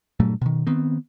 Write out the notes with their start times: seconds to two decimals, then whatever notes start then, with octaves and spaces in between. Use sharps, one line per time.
0.20 G2 A#2 F#3 A3
0.41 B2 D#3
0.67 D#3 B3 C4